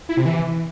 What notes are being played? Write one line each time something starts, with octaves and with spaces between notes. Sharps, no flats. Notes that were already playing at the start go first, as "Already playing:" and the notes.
E4
C3
E3